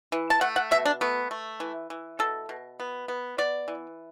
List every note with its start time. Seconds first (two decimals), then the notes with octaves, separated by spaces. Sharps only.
0.12 E3
0.30 A5
0.41 A3 F#5
0.56 F#5
0.71 B2 E5
0.85 D4
1.01 A3 B3
1.31 A3
1.60 E3
1.90 E3
2.19 B2 A4
2.49 B2
2.80 B3
3.08 B3
3.38 B3 D5
3.68 E3